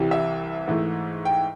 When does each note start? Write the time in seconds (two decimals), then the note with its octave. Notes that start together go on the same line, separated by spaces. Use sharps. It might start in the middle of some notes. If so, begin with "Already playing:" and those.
Already playing: C2 C3 E3 G3
0.11 E5
0.68 G#2 E3 A3
1.25 G5